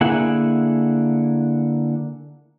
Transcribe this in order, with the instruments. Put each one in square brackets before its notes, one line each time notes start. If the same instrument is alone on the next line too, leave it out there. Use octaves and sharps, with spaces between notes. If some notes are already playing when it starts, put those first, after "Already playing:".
[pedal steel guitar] D3 A#3 E4 G#4 F#5